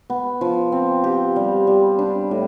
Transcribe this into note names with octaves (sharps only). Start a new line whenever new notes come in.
B3
F3
C4
G4
G3
G3
D4
A2